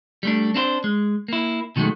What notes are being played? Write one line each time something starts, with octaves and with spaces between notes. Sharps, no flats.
G3 A3 D4
C4 D4 E4 C5
G#3
A#3 E4
B2 D#3 F#3 G#3 A3